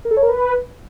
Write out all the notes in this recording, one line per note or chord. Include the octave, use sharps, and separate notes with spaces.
A#4
A4
C#5
A#4
B4